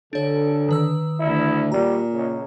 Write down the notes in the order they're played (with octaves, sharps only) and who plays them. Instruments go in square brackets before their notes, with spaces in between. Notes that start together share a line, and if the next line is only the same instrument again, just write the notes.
[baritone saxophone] D3 [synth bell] D4 C#5 [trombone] A4
[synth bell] D#3 B4 E6
[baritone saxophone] D2 [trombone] E4
[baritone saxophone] A#2 [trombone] G3 [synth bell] A#5
[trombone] C#3